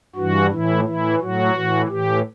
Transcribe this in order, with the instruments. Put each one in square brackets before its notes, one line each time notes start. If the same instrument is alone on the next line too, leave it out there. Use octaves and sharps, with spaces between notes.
[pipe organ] G2 E3 F#4
A2 E3 E4
A2 E3 E4
A2 F#3 F#4
A2 E3
A2 E3 G4